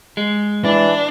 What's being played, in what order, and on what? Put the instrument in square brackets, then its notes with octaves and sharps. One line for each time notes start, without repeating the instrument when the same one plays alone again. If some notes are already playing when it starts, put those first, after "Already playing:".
[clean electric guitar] G#3
[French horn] E3 [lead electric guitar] D4